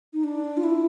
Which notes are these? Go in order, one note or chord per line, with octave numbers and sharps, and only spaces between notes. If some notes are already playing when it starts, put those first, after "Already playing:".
D#4
D4
F4
E4